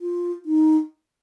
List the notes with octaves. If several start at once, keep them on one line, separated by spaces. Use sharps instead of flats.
F4
D#4